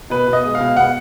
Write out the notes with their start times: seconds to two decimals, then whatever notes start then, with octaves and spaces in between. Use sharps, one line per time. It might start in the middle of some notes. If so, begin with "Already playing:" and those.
0.10 B2 B4
0.28 B2
0.33 D#5
0.44 G#3
0.55 F5
0.61 B2
0.76 B2 F#5